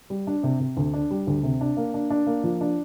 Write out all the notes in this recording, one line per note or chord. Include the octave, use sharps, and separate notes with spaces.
G3
D4
C3
C3
D2
D4
G3
D2
C3
D4
A#3
D4
D4
A#3
F3
D4